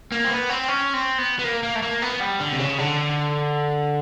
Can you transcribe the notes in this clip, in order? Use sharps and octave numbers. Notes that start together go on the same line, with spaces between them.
A#3
C4
B3
C4
C#4
C4
B3
B3
A#3
A#3
A3
A#3
B3
G3
D3
C3
C#3
D3